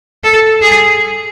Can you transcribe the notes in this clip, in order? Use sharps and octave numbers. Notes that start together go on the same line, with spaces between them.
A4
G#4